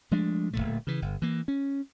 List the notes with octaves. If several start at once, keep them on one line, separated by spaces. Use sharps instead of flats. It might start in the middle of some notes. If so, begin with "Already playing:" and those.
F3 G#3 A3 D4
D1 E2 A#2 A3
C#3 E3
G1
E3 A#3
C#4